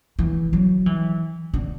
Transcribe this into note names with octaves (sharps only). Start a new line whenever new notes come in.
E3
F#3
E3
D3